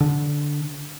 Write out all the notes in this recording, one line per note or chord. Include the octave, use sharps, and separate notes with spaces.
D3